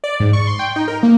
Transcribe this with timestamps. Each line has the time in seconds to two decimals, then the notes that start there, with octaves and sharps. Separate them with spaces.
0.04 D5
0.20 G#2
0.33 C#6
0.47 C6
0.59 G5
0.76 D#4
0.88 A#4
1.03 A#3